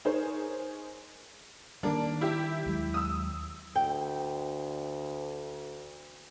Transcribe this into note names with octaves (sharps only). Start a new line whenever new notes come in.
D#4 G#4 A#4 C5 C#5
D#3 G3 A#3 D4
E4 G4 E5
D#2 F#3 G#3
D#6 E6
D2 G5